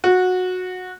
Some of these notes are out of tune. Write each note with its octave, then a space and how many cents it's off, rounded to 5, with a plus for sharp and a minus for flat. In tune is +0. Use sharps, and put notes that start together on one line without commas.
F#4 -15